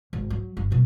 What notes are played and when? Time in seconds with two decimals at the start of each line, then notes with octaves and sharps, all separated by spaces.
0.13 G#1
0.30 F#3
0.57 G1
0.71 B2 G3